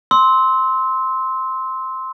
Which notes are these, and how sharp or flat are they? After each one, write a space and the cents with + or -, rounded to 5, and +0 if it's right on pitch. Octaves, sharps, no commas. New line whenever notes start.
C6 +0 E6 -30